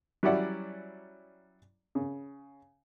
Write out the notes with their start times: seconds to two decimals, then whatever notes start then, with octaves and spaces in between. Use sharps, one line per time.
0.23 F#3 G3 C#4 E4 D5 F#5
1.95 C#3